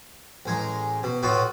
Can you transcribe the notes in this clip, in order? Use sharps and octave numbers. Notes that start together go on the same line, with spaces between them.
A1 G#3 G#5 A#5
B2
A2 B3 F4 F#4